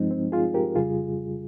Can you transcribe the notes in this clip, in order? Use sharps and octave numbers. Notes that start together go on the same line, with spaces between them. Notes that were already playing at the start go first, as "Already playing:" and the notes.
Already playing: G2 F3 G#3 C4 D#4
C4
F4 G#4
G4 A#4
F2 C#3 G3 F4 G#4